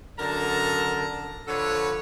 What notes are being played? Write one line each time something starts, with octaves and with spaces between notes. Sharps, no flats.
F#2 D3 A#4 A5 A#5
D3 F3 A4 B4 C#5